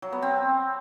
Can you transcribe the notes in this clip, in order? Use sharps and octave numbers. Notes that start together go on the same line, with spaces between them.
F#3
B3
C4